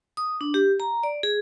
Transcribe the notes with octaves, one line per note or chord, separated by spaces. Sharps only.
D#6
D4
G4
A#5
D5
G#4